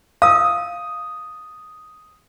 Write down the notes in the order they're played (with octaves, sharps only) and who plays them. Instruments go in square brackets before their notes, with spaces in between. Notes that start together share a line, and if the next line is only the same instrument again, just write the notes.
[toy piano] F5 E6 [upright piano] D#6